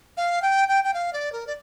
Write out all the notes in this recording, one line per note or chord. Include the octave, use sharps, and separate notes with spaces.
F5
G5
G5
G5
F5
D5
A#4
D5